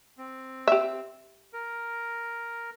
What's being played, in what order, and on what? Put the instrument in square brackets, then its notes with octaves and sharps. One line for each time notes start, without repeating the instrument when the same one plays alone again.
[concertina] C4
[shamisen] G4 E5
[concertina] A#4